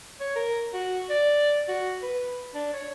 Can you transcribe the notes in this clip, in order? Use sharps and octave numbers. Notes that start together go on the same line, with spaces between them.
C#5
A#4
F#4
D5
F#4
B4
D4
C#5